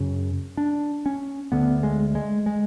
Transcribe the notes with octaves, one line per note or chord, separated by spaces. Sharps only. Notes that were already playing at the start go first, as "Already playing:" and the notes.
Already playing: F#2 C#3 C#4
D4
C#4
D2 D3 B3
G#3
G#3
G#3